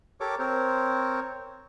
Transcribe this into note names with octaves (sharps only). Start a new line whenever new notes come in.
G4 A4 A#4 C#5 D6
C4 A#4 C5 C#5